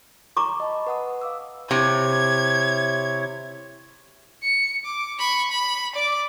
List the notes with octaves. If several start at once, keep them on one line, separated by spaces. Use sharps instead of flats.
A#5 C#6 D6
D#5 A5 B5
B4 F#5 D#6
F5 D6 E6
C3 E4 C#5 G#6
C#7
D6
B5 C#6
B5
D5 D6